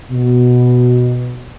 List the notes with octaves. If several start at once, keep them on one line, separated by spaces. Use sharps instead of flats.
B2